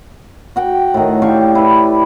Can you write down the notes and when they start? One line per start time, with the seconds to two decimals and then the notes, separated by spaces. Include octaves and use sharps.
0.56 F#4 F#5 G5
0.94 A2 D#3
1.22 D4 G4 F5 C#6
1.55 E4 B4